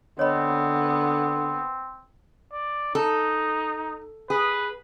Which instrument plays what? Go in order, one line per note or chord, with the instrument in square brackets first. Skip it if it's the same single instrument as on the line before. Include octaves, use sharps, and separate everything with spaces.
[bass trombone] D3 [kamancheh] B3 [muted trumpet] C4 [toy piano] C#5 D#5 B5
[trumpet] D5
[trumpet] D#4 [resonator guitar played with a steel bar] A4
[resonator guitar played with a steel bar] G#4 [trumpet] B4